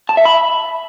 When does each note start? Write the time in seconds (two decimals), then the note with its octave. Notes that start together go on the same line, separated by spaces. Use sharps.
0.09 A5
0.17 E5
0.25 B5